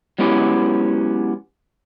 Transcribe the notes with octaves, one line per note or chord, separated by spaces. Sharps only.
F#3 G#3 B3 C#4 E4 G4